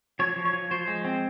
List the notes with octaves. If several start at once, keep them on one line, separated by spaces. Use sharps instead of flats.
F3 C#5
F3
C#5
F3
F3 C5
G#3
C4